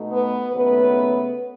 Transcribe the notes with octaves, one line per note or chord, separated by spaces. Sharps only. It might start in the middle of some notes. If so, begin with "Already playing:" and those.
Already playing: B2 A3 D#4
B3 B4
D#2 C#3 F#3 A3 B3 B4